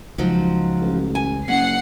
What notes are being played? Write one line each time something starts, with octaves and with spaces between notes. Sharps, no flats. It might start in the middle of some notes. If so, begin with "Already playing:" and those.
C#2 F3 F#3 D#4
A1
G#5
F#1 C#4 F#5 C7